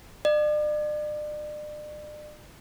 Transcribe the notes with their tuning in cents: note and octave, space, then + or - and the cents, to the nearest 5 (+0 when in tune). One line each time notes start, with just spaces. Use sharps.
D5 +40